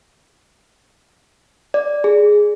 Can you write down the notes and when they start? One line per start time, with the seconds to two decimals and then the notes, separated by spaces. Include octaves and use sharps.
1.74 D5
2.04 G#4